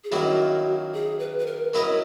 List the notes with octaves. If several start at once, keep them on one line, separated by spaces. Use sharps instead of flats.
G#4
F#2 D#3 F#3 A#3 E4 F#4
G#4
B4
B4
A#4
F#3 C#4 E4 A#4 B4 D#5